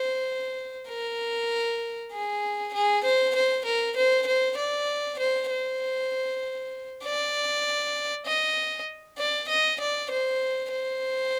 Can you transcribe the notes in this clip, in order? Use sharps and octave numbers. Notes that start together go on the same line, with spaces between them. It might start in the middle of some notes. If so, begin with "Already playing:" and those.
Already playing: C5
A#4
G#4
G#4
C5
C5
A#4
C5
C5
D5
C5
C5
D5
D#5
D5
D#5
D5
C5
C5